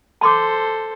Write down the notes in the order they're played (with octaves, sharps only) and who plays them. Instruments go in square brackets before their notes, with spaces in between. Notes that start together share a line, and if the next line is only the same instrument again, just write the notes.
[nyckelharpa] A4 C5 [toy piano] A5 C6 D6